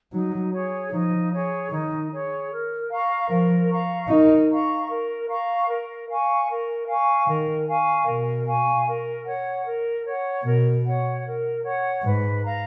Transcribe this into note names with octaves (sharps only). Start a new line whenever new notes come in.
F#3 D#4
G#4 C#5
F3 D#4
G#4 C#5
D#3 D#4
G#4 C#5
A#4
F5 A#5 C#6
F3 A#4
F5 A#5 C#6
D#4 A#4
F5 A#5 C#6
A#4
F5 A#5 C#6
A#4
F5 G#5 C#6
A#4
F5 G#5 C#6
D#3 A#4
F5 G#5 C#6
B2 A#4
F5 G#5 C#6
A#4
C#5 F#5
A#4
C#5 F#5
B2 A#4
C#5 F#5
A#4
C#5 F#5
G#2 B4
F5 A#5